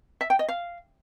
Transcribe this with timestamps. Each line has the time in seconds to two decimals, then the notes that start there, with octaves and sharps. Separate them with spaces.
0.21 E5
0.30 G5
0.39 D#5
0.48 F5